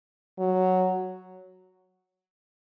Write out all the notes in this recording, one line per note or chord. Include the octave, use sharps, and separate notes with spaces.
F#3